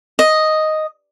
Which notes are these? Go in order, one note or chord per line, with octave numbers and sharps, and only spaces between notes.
D#5